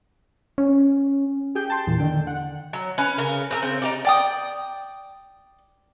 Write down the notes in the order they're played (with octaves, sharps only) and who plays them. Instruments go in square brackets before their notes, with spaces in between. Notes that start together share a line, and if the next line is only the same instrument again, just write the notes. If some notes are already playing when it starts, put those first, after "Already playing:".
[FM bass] C#4
[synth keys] G4 G#4 G5
G5 A5 C6
E2 A#2
D3 D#3 G5
F#5
[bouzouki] F#3
C#4 B4
C#3 A#4
C4 G#4 A#4
C#3 C4
D#4 G4 D5
[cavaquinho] D5 G5 D#6